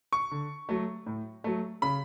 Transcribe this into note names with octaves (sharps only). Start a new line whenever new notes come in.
C#6
D3
F#3 A3
A2
F#3 A3
C#3 B5